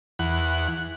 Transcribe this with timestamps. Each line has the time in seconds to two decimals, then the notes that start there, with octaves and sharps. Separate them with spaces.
0.19 E2 F#5